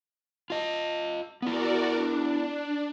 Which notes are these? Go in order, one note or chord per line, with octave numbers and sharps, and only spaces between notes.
F4 D#5
B3 E4 F#4 A#4 D5
D4